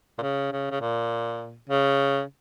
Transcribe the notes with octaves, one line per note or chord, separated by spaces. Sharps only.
A#2
C#3
C#3
C#3
A#2
C#3